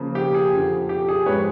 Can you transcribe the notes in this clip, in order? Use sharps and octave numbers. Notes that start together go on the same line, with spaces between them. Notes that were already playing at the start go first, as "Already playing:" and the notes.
Already playing: C#3 F3 A#3
G4
G#4
F2 D3 F3
G4
G#4
G#2 F3 G#3 B4 C#5